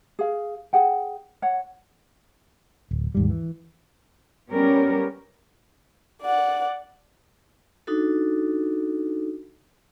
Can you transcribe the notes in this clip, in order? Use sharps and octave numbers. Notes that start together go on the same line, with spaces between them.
G#4 F5
G#4 F#5 G5
C#5 F#5
D1
D#2 G#2 G3
E3
G3 B3 C#4 G4 A#4
D5 F#5
D4 D#4 F#4 A4